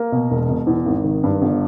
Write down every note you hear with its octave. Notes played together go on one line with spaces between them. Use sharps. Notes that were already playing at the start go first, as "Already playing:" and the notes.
Already playing: A#3
B2
E1
B2
E2
G#1
D#3
G2
G1